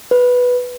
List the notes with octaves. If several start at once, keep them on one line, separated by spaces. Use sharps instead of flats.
B4